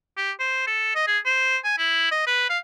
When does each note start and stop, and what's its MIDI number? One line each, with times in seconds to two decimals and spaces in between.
0.17 0.32 67
0.40 0.64 72
0.67 0.91 69
0.95 1.07 75
1.08 1.19 68
1.26 1.57 72
1.64 1.78 80
1.78 2.11 64
2.11 2.26 75
2.27 2.46 71
2.50 2.59 77